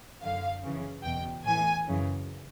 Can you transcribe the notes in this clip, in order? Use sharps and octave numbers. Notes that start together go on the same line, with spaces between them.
F#2 D3 F5
F#2 C#3 E3
E2 B2 G5
A2 E3 G#5
F#2 C#3 E3